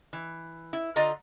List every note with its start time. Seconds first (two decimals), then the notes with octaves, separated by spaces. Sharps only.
0.13 E3
0.73 E4
0.96 D3 F4 D#5 A#5